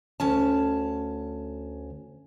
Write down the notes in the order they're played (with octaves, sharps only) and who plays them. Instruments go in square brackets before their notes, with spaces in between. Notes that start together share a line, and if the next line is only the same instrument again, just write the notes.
[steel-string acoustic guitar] D2 C#4 A5